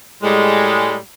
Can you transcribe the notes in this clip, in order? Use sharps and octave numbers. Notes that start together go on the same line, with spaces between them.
A2 G3 G#3